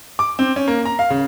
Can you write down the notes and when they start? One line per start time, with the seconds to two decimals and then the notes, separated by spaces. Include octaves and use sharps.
0.19 D6
0.39 C4
0.56 C#4
0.68 A#3
0.85 A#5
0.99 F5
1.10 C#3